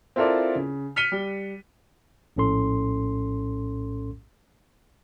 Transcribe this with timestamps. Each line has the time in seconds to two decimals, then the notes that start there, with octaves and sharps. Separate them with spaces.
0.16 C4 E4 F4 A4 A#4 D5
0.55 C#3
0.96 F6 B6 C#7 D#7 G7
1.12 G3
2.36 A#1 A2 C#4 A4 C6